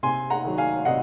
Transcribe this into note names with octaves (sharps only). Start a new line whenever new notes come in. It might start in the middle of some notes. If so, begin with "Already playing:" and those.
C3 G#5 C6
F#5 A#5
D#3 F#3
F5 G#5
C3 D#5 F#5